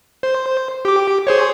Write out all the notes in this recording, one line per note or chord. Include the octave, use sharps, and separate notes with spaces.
C5
G4 D6
G#4 C5 C#5